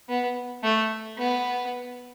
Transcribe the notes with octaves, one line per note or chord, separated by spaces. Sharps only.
B3
A3
B3